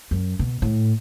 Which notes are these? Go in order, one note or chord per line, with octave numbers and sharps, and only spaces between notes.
F#2
B2
A2